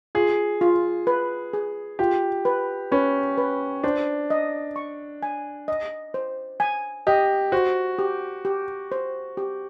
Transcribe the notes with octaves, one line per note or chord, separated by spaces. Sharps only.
F4 G#4
F4
B4
G#4
F4 G4
B4
C#4 B4
B4
D4 C5
D#5
C#6
G#5
D#5
C5
G#5
G4 D#5
F#4 C5
G4
G4
C5
G4